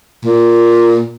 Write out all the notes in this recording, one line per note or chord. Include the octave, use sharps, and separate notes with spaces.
A#2